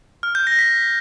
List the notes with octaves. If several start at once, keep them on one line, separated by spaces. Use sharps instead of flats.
F6
G6
A#6
B6